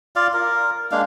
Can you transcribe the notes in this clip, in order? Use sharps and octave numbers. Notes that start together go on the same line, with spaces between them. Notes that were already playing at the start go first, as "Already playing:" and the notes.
F4 D5 F5
A#4
G#3 A#3 D4 F5